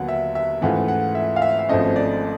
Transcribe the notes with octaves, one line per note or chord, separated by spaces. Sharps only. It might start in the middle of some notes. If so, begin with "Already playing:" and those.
Already playing: D#2 D3 F#3 B3 F#5
E5
E5
G#2 E3 A3 C#4 F4 F#5
F#5
E5
F5
E5
E5
G#1 G#2 F3 A3 C#4 D#5
D5